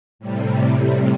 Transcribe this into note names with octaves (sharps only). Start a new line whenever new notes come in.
A2 C3 G3